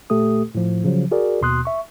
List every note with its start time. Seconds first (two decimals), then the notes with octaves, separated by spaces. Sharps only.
0.10 A#2 A3 G4 A4 D#6
0.55 A2 F3
0.84 C#3 F3 F#3
1.11 F#4 G#4 A#4 D5
1.41 D#2 B2 C6 D#6 F#6
1.65 E5 C#6